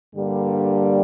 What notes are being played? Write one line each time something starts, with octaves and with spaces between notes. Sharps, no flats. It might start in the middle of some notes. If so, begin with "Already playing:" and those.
G2 D3 G3 A#3